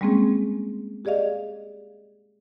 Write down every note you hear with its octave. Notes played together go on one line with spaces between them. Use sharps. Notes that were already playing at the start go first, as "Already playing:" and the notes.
G3 G#3 A#3 C4 C#4 G#4
G4 G#4 D5 D#5 F5